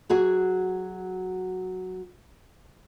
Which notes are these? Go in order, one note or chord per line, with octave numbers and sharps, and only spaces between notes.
F#3 F#4 G#4